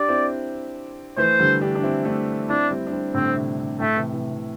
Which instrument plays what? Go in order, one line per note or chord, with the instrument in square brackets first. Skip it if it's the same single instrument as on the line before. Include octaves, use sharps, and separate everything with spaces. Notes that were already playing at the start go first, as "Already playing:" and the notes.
Already playing: [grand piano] D4 G4 [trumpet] D5
[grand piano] C4 E4
[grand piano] E3 A3 [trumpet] C5
[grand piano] D3 G3
D4 G4
D4
C4 E4
A3 D4
[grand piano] C4 E4 [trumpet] D4
[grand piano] G3 C4
D4
G3 C4
[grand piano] A2 D3 [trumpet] C4
[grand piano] C3
C3
[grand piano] A2 [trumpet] A3
[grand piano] C3 E3
C3 E3
C3